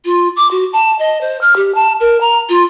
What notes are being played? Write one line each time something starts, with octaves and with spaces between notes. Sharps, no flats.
F4
D6
F#4
A5
D#5
C5
F6
G4
A5
A#4
A#5
F4